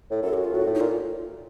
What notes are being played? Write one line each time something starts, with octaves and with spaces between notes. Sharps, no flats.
A2
F#2 A4
F#4
F4
A2 F#4
A2
D#4
A#2 F4